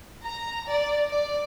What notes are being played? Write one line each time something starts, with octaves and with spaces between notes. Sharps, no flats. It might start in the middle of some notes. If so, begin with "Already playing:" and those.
A#5
D5
D5